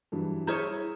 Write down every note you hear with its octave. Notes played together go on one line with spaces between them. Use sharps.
G2 E3 F#3
E4 G#4 C#5 A#5 F6 G6